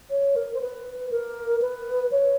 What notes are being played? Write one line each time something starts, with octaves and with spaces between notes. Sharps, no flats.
C#5
A#4
C5
B4
A#4
B4
C#5